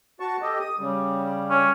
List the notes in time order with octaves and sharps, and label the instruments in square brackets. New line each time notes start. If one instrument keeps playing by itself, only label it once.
[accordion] F#4 A5 C#6
G4 A4 D#5
D#6
C#3 G3
[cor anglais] C#4